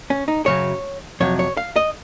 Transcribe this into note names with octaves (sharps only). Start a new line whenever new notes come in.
C#4
D#4
F#2 C#3 F#3 C#5
F2 C3 F#3 C#5
C#5
F5
D#5